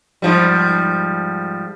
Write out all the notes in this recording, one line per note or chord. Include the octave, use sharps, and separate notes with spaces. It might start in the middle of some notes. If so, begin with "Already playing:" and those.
G#2 F3 G3